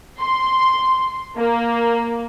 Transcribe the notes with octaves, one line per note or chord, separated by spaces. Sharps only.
C6
A#3